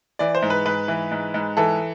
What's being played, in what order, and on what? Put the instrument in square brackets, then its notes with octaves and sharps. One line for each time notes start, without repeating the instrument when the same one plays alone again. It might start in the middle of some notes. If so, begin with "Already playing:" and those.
[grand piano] E3 D5
C5
G#2
B4
G#2 B4
E3
G#2
G#2
E3 A4